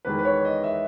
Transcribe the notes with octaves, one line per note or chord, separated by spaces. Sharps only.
E2 D#3 G#3 B4
B4
C#5
D#5
E5